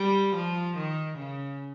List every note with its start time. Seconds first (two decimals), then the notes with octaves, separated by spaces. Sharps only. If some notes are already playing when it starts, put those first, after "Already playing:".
Already playing: G3
0.35 F3
0.77 D#3
1.18 C#3